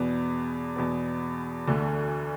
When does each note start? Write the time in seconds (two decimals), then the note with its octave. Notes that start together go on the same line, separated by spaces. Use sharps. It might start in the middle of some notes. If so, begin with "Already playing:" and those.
Already playing: E2 B2 B3
0.76 E2 B2 B3
1.68 D2 D3 A3